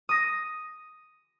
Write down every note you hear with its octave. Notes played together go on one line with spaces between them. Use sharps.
D#6 A#6